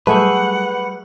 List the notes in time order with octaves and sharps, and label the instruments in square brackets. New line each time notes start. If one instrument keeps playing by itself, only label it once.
[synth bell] F#3 G3 [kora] A3 G#4 E5 [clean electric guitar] B4 [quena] F#5